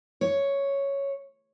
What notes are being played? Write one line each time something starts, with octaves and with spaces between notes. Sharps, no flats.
C#5